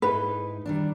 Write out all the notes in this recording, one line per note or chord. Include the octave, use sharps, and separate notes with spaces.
G#2 D#4 E4 B4
D#3 G3 D4